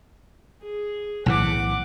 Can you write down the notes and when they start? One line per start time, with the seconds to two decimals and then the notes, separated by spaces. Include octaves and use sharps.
0.62 G#4
1.26 B1 A2 E3 F#5 D6